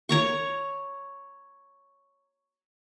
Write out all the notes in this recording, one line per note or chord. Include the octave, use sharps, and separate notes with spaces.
C#5 A#5 C#6